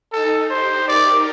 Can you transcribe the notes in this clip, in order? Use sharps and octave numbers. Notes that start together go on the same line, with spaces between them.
D#4 A4
G4 C5
A#4 D5